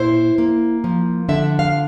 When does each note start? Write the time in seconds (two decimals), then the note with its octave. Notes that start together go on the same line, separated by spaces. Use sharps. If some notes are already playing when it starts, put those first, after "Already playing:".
Already playing: A#2 E4 C5
0.38 A#3
0.84 F3
1.29 D3 E5
1.59 F5